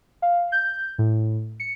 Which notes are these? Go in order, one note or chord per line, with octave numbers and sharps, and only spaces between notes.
F5
G6
A2
C#7